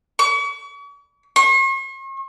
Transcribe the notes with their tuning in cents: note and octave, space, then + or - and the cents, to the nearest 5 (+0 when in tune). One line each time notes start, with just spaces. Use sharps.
C#6 +45
C#6 -45